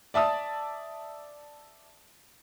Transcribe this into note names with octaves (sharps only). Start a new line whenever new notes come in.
D5 E5 A5 D#6